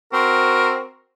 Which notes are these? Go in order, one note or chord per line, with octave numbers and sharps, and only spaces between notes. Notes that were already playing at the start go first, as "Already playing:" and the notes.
C4 F#4 A#4